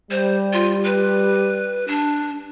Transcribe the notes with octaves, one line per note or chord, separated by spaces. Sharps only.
G3 C5
F4
B4
D4